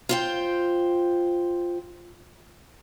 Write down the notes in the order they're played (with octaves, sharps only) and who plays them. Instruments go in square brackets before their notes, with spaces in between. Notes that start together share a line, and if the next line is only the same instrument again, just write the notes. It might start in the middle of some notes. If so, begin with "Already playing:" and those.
[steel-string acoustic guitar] F4 C5 G5